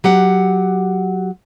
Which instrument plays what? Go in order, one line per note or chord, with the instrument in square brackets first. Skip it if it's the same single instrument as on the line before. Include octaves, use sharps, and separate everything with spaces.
[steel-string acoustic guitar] F#3 G4 F#5